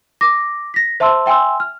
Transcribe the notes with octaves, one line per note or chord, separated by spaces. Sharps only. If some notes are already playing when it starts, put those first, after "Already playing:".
D6 A#6
A#6 B6
C5 E5 A5 C6 E6
E5 G5 G#5 C6 E6
F6